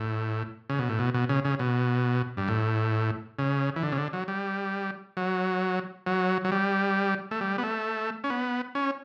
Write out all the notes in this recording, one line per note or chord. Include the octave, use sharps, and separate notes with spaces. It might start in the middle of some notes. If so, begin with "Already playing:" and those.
Already playing: A2
C#3
B2
A2
B2
B2
C#3
C#3
B2
G2
A2
C#3
E3
D3
C#3
D3
F#3
G3
F#3
F#3
F#3
G3
A3
G3
B3
A3
C#4
B3
C#4